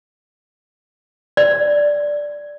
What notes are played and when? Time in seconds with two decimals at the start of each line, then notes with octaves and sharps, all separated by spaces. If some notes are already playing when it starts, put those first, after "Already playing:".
1.37 D5